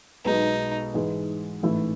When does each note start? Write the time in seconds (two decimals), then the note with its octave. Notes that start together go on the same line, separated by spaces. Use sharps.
0.25 B1 B2 G#3 B3 D#4
0.94 G#2 E3 G#3
1.63 A1 G#2 E3 A3 E4